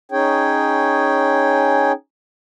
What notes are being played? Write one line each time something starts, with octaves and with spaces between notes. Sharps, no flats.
C#4 D#4 G#4 C#5 G5